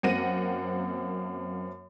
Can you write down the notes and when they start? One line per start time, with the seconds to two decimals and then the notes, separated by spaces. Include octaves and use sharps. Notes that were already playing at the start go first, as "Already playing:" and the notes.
0.03 F#2 A#3 C4 F#5 A#6 D#7